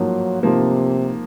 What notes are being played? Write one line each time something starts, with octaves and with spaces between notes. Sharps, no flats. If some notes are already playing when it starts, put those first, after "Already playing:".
Already playing: G#2 F3 F#3 A#3
G#2 C3 F3 A#3